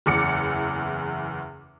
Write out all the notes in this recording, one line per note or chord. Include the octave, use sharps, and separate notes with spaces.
F#1 E2 D6 C#7